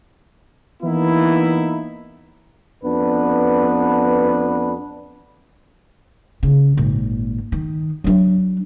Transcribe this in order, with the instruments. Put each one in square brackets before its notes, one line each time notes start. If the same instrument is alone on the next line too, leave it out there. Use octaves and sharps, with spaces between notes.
[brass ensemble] E3 A#3 B3 D#4 E4
[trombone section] F2 B3 D4 B4
[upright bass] C#3
G#1 A#2
D#3
F#3 D4